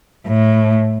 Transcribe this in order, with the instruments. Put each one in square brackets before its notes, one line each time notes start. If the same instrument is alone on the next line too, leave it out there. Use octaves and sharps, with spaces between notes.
[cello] A2